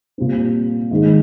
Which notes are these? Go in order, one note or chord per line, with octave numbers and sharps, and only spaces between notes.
A#2 G3 C4
G#2 D#3 G#3